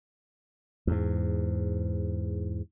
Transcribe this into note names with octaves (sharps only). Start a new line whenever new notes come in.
E2 G#2